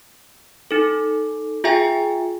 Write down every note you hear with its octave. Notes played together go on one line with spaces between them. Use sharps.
D#4 A4
F4 G#4 E5 G5 G#5